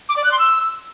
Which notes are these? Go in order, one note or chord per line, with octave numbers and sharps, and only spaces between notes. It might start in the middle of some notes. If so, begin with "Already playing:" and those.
D6
D5
F#6
C6
E6